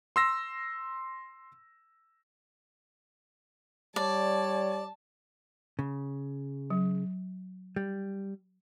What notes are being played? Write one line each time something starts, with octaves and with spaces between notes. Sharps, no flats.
C6 E6 A#6
G3 C#5 D5 A5
C#3
F#3
G3